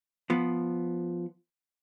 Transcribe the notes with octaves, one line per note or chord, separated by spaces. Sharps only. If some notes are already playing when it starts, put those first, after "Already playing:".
F3 B3